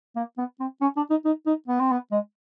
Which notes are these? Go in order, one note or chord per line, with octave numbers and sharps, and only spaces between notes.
A#3
B3
C4
C#4
D4
D#4
D#4
D#4
B3
C4
B3
G#3